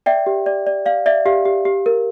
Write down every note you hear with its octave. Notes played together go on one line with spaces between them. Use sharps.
D5 E5 G5
G4
D5
D5
D5 F5
D5 E5
G4 F5
G4
G4
A#4